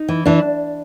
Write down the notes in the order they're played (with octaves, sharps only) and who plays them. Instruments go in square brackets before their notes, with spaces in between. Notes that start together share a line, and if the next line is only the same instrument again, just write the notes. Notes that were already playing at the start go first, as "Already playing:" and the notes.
Already playing: [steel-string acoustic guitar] D#4
[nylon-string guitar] E3
[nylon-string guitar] E3 [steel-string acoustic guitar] D4